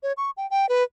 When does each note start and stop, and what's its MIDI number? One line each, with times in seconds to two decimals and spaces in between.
0.03 0.13 73
0.17 0.31 85
0.37 0.49 79
0.50 0.69 79
0.69 0.83 71